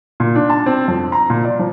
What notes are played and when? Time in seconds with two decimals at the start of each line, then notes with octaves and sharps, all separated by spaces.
0.20 A#2
0.35 D4
0.50 A5
0.66 C4
0.88 F2
1.12 A#5
1.30 A#2
1.45 D5
1.59 F3